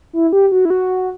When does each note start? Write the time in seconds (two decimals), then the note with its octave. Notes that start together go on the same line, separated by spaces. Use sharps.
0.13 E4
0.33 G4
0.52 F#4
0.65 E4
0.70 F#4